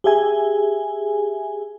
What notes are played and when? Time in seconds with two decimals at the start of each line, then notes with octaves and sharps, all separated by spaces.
0.04 G4 G#4 E5 G#5